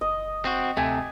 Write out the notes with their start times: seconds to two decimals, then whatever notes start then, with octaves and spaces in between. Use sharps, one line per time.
0.01 F#1 D#5
0.45 C4 F#4
0.77 D2 C3 A3 G#5